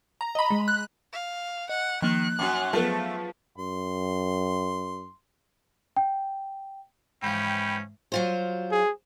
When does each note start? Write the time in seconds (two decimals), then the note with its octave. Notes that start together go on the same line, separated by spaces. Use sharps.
0.21 A#5
0.35 D#5 B5
0.50 G#3
0.68 F#6
1.13 F5
1.69 D#5 F#5
2.02 D#3 F3 A#3 F#6
2.39 F#2 C#4 F#4 G5 D6
2.73 F3 F#3 A3 B3 G#4 C7
3.58 F#2 C6
5.97 G5
7.23 G#2 E3 F3 C#4 G5 B5
8.12 F#3 F4 C5
8.71 G#4